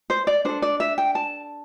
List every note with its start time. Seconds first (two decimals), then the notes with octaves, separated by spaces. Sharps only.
0.10 C5
0.27 D5
0.45 D4 A4 C5
0.62 D5
0.80 E5
0.98 G5
1.15 A5